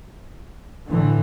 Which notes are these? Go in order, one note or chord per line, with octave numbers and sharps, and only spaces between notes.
A2 D3 E3